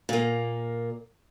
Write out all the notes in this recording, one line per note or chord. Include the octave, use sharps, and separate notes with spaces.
A#2 A#3